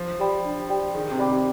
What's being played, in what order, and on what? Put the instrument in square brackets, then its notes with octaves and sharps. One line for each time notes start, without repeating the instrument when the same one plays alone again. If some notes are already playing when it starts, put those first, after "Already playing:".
Already playing: [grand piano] F3
[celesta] G4 D5 G5 B5
D4
G4 D5 G5 B5
[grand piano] D#3 [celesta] G#4
[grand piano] C3
[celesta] D5 G5 B5 D6
[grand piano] C3